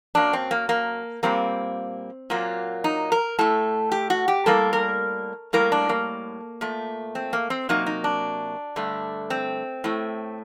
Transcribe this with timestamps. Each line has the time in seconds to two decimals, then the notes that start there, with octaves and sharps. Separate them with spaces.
0.15 F#2 F#3 A#3 D4
0.33 C4
0.51 A#3
0.69 A#3
1.23 A#2 G3 A#3 C4
2.30 A#2 F#3 A#3
2.84 D#4
3.12 A#4
3.39 A2 A3 A4
3.92 G4
4.10 F#4
4.28 G4
4.46 A2 G3 A#3 A4
4.73 A#4
5.53 A2 G3 A#3 A#4
5.72 D4
5.89 A#3
6.61 A#2 A3
7.15 C4
7.33 A#3
7.50 C4
7.69 C3 F#3 A#3 D#4
7.86 D#4
8.04 D4
8.76 G2 D3 A3
9.30 C4
9.84 A2 A3